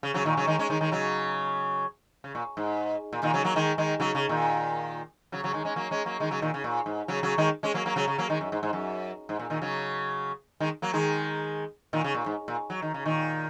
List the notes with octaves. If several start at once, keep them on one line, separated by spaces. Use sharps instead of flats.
C#3
C#3 F#3
A#2 D#3
C#3 F#3
D#3 G#3
G#3 C#4
D#3 G#3
D#3 G#3
C#3 F#3
C#3
A#2
G#2
A#2
A#2 D#3
C#3 F#3
F#3 A#3
D#3 G#3
D#3 G#3
C#3 F#3
C#3
A#2 D#3
C#3 F#3
C#3 F#3
D#3 G#3
G#3 C#4
F#3 A#3
G#3 C#4
F#3 A#3
D#3 G#3
C#3 F#3
A#2 D#3
C#3
A#2
G#2
C#3 F#3
C#3 F#3
D#3 G#3
G#3 C#4
F#3 A#3
F#3 A#3
C#3 F#3
C#3
F#3 A#3
D#3 G#3
F#2
G#2
G#2
F#2
G#2
A#2
A#2 D#3
C#3 F#3
D#3 G#3
F#3 A#3
D#3 G#3
A#2 D#3
C#3
A#2
G#2
A#2
F#3
D#3
C#3
A#2 D#3